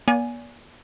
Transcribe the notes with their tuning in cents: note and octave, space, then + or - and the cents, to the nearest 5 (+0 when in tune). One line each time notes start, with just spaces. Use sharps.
B3 -45 D5 -35 G#5 +0